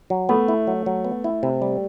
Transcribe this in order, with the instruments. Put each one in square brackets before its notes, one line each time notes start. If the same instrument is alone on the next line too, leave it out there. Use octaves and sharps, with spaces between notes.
[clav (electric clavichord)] F#3
[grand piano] A3 [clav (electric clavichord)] B3
[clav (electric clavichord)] E4
F#3
F#3
B3
E4
C3
G3